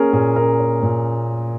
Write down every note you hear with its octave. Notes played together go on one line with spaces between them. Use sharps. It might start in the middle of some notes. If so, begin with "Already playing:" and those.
Already playing: A#3 C#4 G#4 A#4
A#2 G#4
C#4 A#4
C#4
A#2